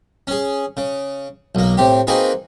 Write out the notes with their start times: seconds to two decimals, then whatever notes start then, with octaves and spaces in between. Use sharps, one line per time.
0.27 C#4 G#4
0.77 C#3
1.55 B1 A#3
1.77 A2 C4 G4
2.07 A#3 C4 D#4 F#4 G#4 B4